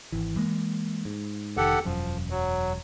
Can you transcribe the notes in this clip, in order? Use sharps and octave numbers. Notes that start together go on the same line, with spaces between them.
G#1 E3
E3 G#3 A#3
G#2
F1 D#3 G4 A4 F#5
E1 F#2 F3
F#3